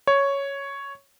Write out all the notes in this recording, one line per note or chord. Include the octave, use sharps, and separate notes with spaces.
C#5